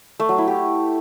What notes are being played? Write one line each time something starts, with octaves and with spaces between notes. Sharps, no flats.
A3
F#3
E4
G4